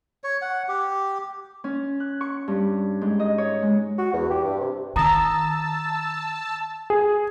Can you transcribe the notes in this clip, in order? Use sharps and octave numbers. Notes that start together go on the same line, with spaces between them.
C#5
F#5
G4
C#4
F#6
C#6
G2
G#2
D#5
C#5
G#3
F#4
E2
G4
G2
C3
D#3 A5 A#5 D#6 E6 A#6
G#4